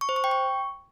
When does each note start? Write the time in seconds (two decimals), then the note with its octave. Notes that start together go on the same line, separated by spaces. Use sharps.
0.01 C#6
0.09 C5
0.16 C#6
0.24 G5
0.31 C#6